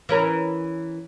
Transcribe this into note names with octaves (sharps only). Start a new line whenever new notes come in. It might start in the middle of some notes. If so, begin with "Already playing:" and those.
E3 C#4 A#4